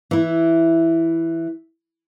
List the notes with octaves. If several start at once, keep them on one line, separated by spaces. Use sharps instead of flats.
E3 E4